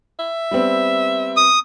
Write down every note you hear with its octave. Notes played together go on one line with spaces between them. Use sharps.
E5
G3 B3 C4
D#6